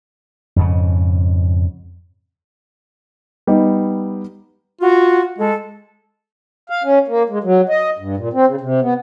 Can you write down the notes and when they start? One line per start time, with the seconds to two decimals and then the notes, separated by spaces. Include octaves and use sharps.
0.56 F2 G#2 C#3
3.47 G3 B3 D#4
4.81 F4 F#4
5.39 G#3 A4
6.70 F5
6.84 C#4
7.08 A#3
7.30 G#3
7.44 F#3
7.69 D#5
7.99 G2
8.17 A#2
8.33 C4
8.47 C#3
8.61 C3
8.82 B3